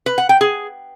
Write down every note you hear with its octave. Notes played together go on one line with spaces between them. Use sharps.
B4
F#5
G5
G#4